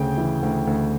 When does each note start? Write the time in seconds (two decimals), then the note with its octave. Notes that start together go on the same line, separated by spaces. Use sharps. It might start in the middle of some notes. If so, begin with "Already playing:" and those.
Already playing: D2 C#3 G5
0.17 E3
0.42 D2
0.67 D2